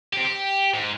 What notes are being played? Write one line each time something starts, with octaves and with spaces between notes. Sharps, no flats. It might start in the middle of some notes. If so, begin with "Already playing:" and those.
C4 G4
G4
G#2